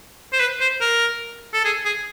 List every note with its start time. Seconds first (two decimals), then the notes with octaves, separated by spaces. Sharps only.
0.33 C5
0.40 B4
0.61 C5
0.81 A#4
1.54 A4
1.65 G#4
1.85 G#4